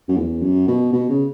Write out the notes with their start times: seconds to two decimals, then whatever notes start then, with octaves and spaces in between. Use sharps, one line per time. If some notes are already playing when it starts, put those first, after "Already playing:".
0.08 F#2
0.17 E2
0.42 F#2
0.68 B2
0.93 B2
1.10 C#3